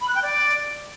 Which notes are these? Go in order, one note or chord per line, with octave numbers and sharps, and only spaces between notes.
B5
F#6
G5
D5